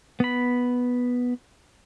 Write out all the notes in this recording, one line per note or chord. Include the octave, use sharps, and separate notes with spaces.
B3 B5